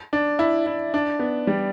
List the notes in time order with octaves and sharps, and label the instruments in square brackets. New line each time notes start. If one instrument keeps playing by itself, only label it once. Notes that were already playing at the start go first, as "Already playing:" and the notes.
[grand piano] D4
E4
E4
D4
B3
G3